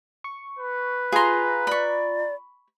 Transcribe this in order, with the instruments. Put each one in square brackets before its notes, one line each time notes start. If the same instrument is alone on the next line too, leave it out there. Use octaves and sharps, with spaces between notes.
[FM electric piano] C#6
[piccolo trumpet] B4
[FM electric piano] F4 A#5 [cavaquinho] G#4 C6
[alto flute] D5 [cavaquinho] B5 C#6